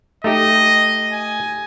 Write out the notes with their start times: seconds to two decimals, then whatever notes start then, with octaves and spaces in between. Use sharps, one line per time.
0.24 A3 D#4 G4 D#5
1.12 G#5